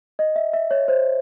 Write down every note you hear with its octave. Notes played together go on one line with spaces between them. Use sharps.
D#5
E5
E5
C#5
C5